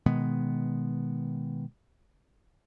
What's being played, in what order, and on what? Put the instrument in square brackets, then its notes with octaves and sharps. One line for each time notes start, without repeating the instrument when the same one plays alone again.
[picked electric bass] B2 D#3 G#3 B3